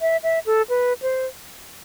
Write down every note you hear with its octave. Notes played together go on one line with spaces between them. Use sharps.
E5
E5
A4
B4
C5